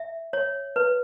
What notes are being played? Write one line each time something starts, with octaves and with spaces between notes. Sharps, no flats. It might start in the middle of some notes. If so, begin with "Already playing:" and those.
Already playing: E5
C#5
B4